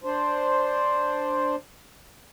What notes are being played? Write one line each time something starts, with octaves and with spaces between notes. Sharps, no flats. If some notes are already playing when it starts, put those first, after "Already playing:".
D4 C5